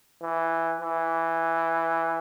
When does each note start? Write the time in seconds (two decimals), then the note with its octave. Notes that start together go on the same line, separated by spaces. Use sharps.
0.22 E3
0.82 E3